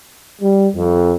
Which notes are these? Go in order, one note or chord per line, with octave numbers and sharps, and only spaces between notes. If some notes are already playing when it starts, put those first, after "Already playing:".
G3
F2